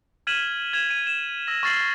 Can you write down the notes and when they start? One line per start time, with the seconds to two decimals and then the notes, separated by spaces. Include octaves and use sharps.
0.27 F6 G#6 B6 D#7 E7 F#7
0.73 G#6 E7 F7
0.90 D#7
1.07 E7
1.47 E6 A#6
1.63 C#6 F6 A6 C7 F#7